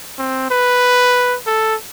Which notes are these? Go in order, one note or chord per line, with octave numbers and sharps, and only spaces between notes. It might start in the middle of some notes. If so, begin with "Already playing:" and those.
C4
B4
A4